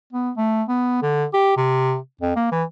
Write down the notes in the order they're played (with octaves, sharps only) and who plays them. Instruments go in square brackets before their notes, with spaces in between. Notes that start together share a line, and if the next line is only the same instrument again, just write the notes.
[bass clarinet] B3
A3
B3
D3
G4
C3
F2
A#3
E3